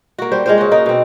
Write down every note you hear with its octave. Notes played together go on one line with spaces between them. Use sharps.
A#3 F#4
G3 C5
G#3 F4 C5
C#3 F#4
A#3 D#4
B2 C4